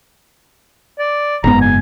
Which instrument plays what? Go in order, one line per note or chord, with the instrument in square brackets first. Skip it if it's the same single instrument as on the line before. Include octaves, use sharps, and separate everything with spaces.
[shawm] D5
[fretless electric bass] F#1 G#2 B3 [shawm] A#5
[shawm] G#5